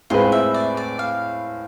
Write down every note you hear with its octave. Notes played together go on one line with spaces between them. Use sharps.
A2 G#3 C4 F4 G#4 B4
E5
D5
D5
F5